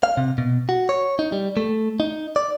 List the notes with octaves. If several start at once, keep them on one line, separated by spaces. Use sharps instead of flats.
F5
C3
B2
F#4
C#5
D#4
G3
A3
D#4
D5